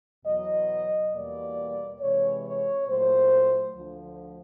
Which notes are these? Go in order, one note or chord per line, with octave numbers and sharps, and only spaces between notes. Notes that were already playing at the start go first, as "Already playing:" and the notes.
E2 B2 F#3 D#5
E2 B2 G3 A#3 D5
C3 E3 G#3 C#5
C#5
A#2 F#3 A3 C5
D2 D3 F3